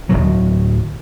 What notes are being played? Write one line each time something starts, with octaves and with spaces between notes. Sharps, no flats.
D1 B1 A2 F#3